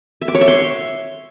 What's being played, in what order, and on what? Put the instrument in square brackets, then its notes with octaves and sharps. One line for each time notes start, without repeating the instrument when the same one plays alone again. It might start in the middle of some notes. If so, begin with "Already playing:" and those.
[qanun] E5
D6
C#5
E5
C6